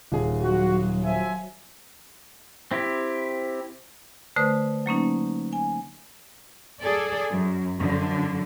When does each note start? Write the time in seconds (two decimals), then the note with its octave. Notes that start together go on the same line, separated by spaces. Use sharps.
0.12 D#1 G#4
0.42 F#3 F#4
1.04 F3 E5 G#5
2.71 C4 E4 G4
4.36 D3 A3 B4 C5 D#6
4.86 F#3 A#3 C#4 D#4
5.53 G#5
6.81 G#4 A4 D5
7.32 F#2
7.79 F#2 D3 F3